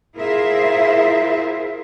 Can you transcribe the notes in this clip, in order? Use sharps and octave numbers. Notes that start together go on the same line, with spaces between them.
E4 F4 G#4 A#4 C5 E5